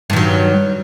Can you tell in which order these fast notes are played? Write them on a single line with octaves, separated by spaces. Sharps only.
G2 D#3 F#3